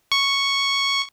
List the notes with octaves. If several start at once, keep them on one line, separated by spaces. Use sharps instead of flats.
C#6